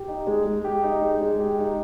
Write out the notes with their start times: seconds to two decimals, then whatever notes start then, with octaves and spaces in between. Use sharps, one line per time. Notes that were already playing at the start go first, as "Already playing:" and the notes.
Already playing: G4
0.08 D#4
0.27 G#3
0.46 G#3
0.65 G4
0.83 D#4
1.02 G#3
1.21 G#3
1.40 G4
1.59 D#4